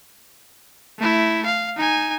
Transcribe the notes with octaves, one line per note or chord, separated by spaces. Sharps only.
A3 E4
F5
D#4 G#5